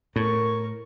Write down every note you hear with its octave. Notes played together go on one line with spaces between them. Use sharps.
A2 A#4 C#6